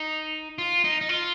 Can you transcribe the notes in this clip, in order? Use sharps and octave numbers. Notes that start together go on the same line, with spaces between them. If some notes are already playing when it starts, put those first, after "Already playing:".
Already playing: D#4
F4
D#4
D#4
F4